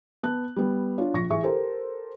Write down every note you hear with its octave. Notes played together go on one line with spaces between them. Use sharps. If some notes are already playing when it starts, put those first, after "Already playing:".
B3 A5 F#6
G3 B3
D4 F4 C#5
A#1 C#6 A#6
A1 G#4 E5 C#6
G4 A4 A#4 C5